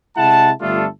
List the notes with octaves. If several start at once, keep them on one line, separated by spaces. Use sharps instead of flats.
C3 G#3 E4 F#5 A5
G1 G3 A3 D4 F4 A4